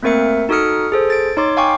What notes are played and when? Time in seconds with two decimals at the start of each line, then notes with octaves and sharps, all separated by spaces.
0.03 A3 A#3 C4 A#4 E5 C#7
0.49 D#4 F#4 A4 D#6 F6 C#7
0.92 G#4 A4 C5
1.10 A6 D7
1.37 D#4 C#5 C6 D6
1.57 F5 G5 G#5 C#6 D6